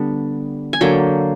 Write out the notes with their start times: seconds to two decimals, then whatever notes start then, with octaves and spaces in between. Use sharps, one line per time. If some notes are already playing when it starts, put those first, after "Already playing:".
Already playing: D3 G3 B3 D4
0.73 G#5
0.81 D3 F#3 A#3 G5